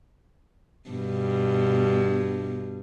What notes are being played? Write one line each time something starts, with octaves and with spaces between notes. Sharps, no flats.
G2 B2